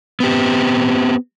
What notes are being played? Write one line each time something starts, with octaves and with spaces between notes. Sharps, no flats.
B3 C4 G4